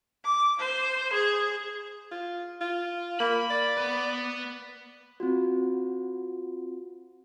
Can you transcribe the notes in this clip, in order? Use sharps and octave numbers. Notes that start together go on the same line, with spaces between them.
D6
C5
G#4
F4
F4
A#3 B5
D5
B3 B4
C4 F4 F#4